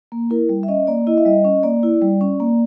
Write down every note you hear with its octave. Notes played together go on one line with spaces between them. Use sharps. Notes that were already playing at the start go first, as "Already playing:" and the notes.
A#3
E4 A#4
G3
E5
C#4 D#5
A#3 D5
E4 D#5
E5
G3 D#5
C#4
A#3 D5
E4
G3
C#4
A#3